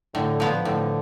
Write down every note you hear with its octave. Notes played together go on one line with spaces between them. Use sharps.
A2 D3
F3 B3
A2 D3